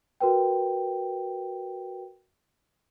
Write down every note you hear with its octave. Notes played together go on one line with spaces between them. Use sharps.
F#4 A#4 B4 G5